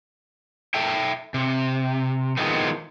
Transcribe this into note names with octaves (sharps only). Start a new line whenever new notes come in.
A4 E5 G5
C3
D#3 F3 G#3 A3 B3 C4